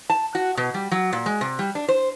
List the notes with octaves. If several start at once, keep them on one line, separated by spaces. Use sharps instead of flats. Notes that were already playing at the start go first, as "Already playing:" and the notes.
A5
F#4
B2
G3
F#3
A#2
G#3
C3
G3
D4
C5